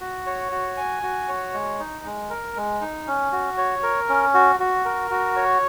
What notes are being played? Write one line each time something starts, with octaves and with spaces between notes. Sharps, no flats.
F#4
C#5
F#4
G#5
F#4
C#5
G#3
D#4
G#3
A#4
G#3
D#4
C#4
F#4
C#5
A#4
C#4
F#4
F#4
A#4
F#4
C#5